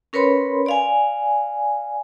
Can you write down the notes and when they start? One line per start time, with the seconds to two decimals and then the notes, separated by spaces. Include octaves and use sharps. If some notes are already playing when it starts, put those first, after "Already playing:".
0.13 C#4 A#4 B4 C#5 B5 C6
0.66 D5 F5 G#5